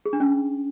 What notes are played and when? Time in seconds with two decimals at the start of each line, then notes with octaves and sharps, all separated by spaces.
0.06 G#4
0.13 D4
0.20 C#4